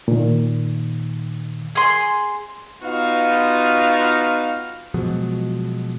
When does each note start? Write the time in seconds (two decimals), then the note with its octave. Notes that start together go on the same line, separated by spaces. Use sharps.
0.08 A#2 D#3
1.75 G#4 C6
2.83 B3 D#4 F4 F#4 F5
4.94 B2 F3 F#3 G#3